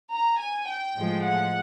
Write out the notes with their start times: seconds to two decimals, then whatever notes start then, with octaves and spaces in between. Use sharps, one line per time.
0.12 A#5
0.40 G#5
0.69 G5
0.98 A2 F3 G#3
1.26 F#5